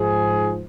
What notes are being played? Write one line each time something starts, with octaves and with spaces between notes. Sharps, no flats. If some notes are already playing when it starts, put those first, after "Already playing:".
Already playing: G#2 F3 G#4